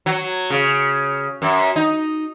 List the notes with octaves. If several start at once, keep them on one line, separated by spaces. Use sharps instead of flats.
F#3
C#3
F#2
D#4